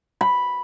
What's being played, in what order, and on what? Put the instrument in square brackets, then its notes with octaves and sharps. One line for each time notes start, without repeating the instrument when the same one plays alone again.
[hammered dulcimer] B5